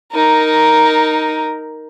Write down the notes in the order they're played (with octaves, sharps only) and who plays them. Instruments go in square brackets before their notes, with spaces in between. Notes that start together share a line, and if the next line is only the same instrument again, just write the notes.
[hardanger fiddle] D#4 A#4